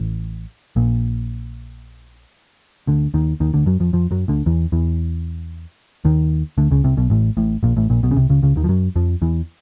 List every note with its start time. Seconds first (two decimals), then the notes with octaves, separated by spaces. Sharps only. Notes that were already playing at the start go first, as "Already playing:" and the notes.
Already playing: A1 A2
0.76 A#1 A#2
2.87 D2 D3
3.14 D#2 D#3
3.40 D#2 D#3
3.54 D2 D3
3.66 F#2 F#3
3.80 F2 F3
3.93 F2 F3
4.11 F#2 F#3
4.28 D2 D3
4.46 E2 E3
4.72 E2 E3
6.05 D#2 D#3
6.58 D2 D3
6.71 C#2 C#3
6.84 C2 C3
6.97 B1 B2
7.10 A1 A2
7.37 A1 A2
7.63 A#1 A#2
7.77 A1 A2
7.90 A#1 A#2
8.03 B1 B2
8.11 C#3
8.16 C2 C3
8.29 C#2 C#3
8.43 C#2 C#3
8.56 D#2 D#3
8.64 F3
8.69 F#2 F#3
8.96 F2 F3
9.22 E2 E3